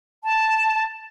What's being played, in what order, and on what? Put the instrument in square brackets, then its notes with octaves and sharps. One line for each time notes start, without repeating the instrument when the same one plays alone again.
[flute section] A5